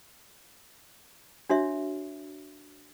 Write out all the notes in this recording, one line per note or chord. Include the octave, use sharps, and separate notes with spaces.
D4 F#4 C#5 E5